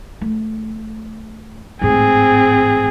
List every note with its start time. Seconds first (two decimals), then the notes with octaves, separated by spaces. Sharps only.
0.21 A3
1.81 A1 G#2 C4 G#4